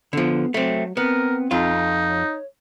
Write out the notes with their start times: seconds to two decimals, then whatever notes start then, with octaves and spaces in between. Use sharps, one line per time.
0.13 D3 F3 B3
0.54 F#3 A3 C4
0.97 B3 C4 A#4
1.51 F2 D#4 F4
2.08 C#5